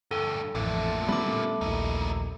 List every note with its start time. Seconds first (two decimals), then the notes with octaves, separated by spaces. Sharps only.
0.11 D2 G2 A4
0.55 A1 F2 A#2 D3 A3
1.08 G3 B3 C#4 B5 D6
1.61 A#1 D#2 D#4 E4